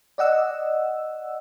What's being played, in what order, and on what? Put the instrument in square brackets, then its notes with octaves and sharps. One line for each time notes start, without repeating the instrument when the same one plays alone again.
[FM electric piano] D5 D#5 F#5 E6